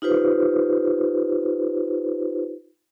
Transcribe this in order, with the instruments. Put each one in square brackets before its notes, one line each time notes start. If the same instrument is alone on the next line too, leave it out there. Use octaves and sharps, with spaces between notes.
[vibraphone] D#4 F4 G4 B4 C5